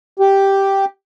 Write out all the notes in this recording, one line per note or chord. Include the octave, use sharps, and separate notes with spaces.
G4